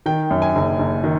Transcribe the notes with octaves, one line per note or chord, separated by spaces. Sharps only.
D#3 G5
F#2
G#5
F#1
F#1
D#3